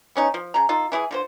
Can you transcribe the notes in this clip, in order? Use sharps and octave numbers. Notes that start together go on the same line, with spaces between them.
B3 C#4 D#4
F3
C#3 A#5
D#4 F4 A4
E3 E4 G4 G#4
D3 F4 C5